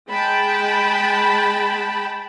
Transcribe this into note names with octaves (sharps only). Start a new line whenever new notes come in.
G#3 G5 A5 B5